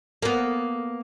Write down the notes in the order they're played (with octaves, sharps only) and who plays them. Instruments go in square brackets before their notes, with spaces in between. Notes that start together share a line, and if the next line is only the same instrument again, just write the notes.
[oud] A#3 B3